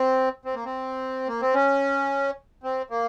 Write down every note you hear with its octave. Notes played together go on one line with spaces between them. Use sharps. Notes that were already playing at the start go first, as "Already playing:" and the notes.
Already playing: C4
C4
A#3
C4
A#3
C4
C#4
C4
A#3